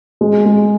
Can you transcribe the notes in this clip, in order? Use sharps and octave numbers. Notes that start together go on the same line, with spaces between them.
G#3
G#3